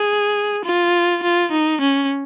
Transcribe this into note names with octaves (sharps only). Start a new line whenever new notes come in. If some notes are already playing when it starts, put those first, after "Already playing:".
Already playing: G#4
F4
F4
D#4
C#4